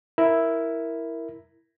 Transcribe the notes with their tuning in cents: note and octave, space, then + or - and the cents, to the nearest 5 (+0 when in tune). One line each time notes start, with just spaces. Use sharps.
E4 +0 A#4 +0